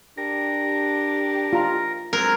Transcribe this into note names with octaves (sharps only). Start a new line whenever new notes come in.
D4 G4 A#4
F4 A#5
F#3 G#3 C4 A#4